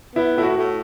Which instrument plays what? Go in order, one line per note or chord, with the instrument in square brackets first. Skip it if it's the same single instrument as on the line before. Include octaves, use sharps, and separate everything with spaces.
[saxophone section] B3 [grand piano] E4
[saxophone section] A2 [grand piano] E4
[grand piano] F#4
[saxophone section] A2